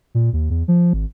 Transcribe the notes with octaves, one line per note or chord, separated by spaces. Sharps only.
A#2
D#2
E2
F3
G#1